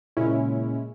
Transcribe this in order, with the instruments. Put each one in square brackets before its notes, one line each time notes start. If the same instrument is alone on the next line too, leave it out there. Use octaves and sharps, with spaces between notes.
[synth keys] A#2 C#3 G#3 C#4 E4